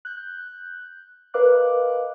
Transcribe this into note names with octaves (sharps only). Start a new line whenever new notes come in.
F#6 G6
A#4 B4 D#5 F5 D6 F#6